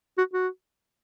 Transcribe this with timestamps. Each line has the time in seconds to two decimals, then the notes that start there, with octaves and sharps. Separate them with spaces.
0.18 F#4
0.33 F#4